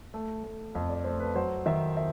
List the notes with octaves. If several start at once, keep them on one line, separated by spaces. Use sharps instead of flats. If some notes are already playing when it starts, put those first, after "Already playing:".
A3
A3
F2
D5
A3 C5
B4
F#3 C5
D#3 E5
E5